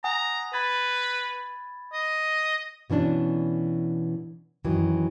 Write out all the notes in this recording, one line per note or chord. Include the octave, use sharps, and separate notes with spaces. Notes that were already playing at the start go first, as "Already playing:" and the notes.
F#5 G#5 A#5 D#6
B4 B5 G#6 A6
D#5
B2 E3 C#4 D4
F#2 D#3 E3 F#3